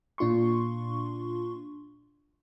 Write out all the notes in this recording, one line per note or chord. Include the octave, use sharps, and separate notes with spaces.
A#2 D4 F4 C6 C#6